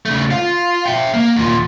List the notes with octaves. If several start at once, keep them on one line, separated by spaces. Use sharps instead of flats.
C#3 A3
F4
E5 G5
A#3
D#2 A#2